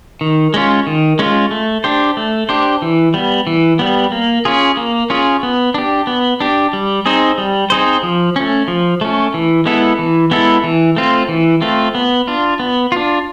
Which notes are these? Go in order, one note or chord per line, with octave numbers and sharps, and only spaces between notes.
D#3
G#3 C#4 F4
D#3
G#3 C#4 F4
A3
D4 G4 C5
A3
D4 G4 C5
E3
G3 B3
E3
G3 B3
A#3
C#4 F4 G#4
A#3
C#4 F4 G#4
B3
D4 G4
B3
D4 G4
G3
C4 D#4 G#4 C5
G3
C4 D#4 G#4 C5
F3
A3 C#4
F3
A3 C#4
E3
G#3 B3 E4 A4
E3
G#3 B3 E4 A4
E3
A3 C4 F4
E3
A3 C4 F4
B3
D4 F4
B3
D4 F4